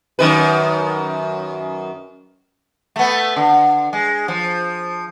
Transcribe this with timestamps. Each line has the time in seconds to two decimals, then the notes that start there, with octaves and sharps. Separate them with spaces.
0.19 F#2 D#3 B4
2.96 A3 B3
3.36 D3
3.93 G#3
4.28 F3